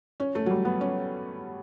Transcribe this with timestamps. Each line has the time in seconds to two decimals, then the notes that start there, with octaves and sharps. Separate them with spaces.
0.20 C#4
0.35 A3
0.46 F#3
0.50 G3
0.65 B3
0.81 C#4